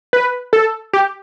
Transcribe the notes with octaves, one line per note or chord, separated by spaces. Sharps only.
B4
A4
G4